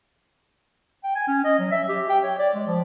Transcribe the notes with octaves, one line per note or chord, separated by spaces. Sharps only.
G5
G#5
C#4
D#5
F#3
E5
G4
G5
C#5
D5
G#3
F3